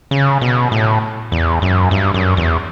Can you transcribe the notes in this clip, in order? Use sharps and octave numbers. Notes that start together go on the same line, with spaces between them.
C#3
B2
A2
E2
F#2
G2
F#2
E2